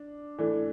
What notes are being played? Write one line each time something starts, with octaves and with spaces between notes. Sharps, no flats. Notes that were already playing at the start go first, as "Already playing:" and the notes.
Already playing: D4
E3 A3 D4